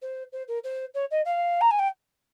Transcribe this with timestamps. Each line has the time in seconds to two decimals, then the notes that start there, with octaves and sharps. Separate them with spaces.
0.02 C5
0.32 C5
0.48 A#4
0.64 C5
0.94 C#5
1.11 D#5
1.25 F5
1.61 A#5
1.71 G#5
1.79 G5